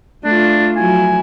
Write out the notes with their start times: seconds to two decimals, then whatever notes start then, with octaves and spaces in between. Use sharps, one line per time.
0.25 A3 D4 F4
0.76 F3 F#3 E4 G#5